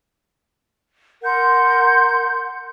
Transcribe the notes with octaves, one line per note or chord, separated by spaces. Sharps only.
A#4 F#5 C6 G6